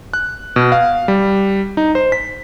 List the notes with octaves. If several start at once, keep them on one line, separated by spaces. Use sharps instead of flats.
F#6
B2
F5
G3
D#4
C5
B6